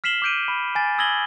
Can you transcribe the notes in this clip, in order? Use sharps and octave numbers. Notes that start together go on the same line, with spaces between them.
F6 B6 C7 E7 F#7 G7
D6 F6 G6 D7 D#7
B5
G#5 A6
D#6 E6 G#6 A#6 F#7 G7